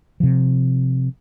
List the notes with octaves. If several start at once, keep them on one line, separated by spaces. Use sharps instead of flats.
C3 F3